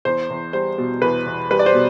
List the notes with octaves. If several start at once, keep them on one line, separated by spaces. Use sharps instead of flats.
E2 C5
E2
G3 C5
B2
E2 B4
E2
G3 B4
D5
C5
B2